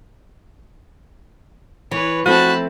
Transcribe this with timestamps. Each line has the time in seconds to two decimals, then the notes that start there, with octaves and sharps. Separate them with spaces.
1.91 E3 B4 C#5
2.26 F3 A3 C4 F#4 A5 B5